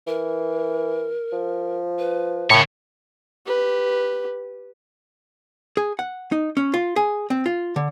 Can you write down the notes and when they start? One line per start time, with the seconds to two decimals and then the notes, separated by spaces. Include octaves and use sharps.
0.07 E3 A#4
1.33 F3
1.99 B4
2.50 A2 C#3 A#4 C#5
3.46 G4 B4
5.77 G#4
5.99 F#5
6.32 D#4
6.57 C#4
6.74 F4
6.96 G#4
7.30 C4
7.46 F4
7.76 D3